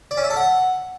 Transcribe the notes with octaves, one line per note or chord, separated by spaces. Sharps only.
D5
C#4
E5
A4
F#5